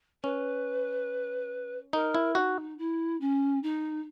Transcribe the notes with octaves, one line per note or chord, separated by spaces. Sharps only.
C#4 B4
D#4 A#4
E4
D#4 F#4
E4
C#4
D#4